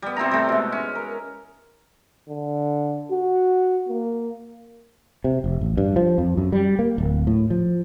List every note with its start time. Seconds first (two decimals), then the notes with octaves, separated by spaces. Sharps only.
0.02 G3 B3
0.16 C3 C4 E4 A#5
0.31 C3 G3 A3
0.49 B2 G#3
0.72 C#4
0.95 A#4
2.29 D3
3.11 F#4
3.89 A#3
5.24 C3
5.44 F1
5.61 A1
5.77 G2
5.96 F3
6.18 F2
6.37 F#2
6.52 G3
6.79 A#3
6.98 D1
7.27 A2
7.50 F3